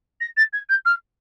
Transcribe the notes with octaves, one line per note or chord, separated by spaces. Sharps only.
A#6
A6
G#6
G6
F6